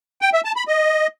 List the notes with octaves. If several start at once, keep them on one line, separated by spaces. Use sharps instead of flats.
G5
E5
A5
B5
D#5